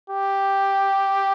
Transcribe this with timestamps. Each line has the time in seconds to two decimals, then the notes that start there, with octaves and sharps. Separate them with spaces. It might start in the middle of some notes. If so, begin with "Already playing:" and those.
0.10 G4